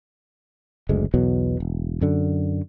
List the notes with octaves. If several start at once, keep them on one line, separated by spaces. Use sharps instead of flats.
F#1 D2 G#3
B1 E2 B2 F#3
E1
F#2 D3